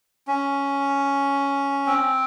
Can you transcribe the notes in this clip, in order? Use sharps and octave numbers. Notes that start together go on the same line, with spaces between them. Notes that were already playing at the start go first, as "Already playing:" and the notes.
C#4
C4